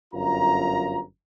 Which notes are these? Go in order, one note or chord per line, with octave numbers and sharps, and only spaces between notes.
G1 F#2 F4 A#5